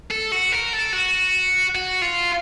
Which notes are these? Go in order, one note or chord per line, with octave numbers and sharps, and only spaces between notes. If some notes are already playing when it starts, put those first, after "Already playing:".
A4
F#4
A#4
A4
F#4
F#4
F4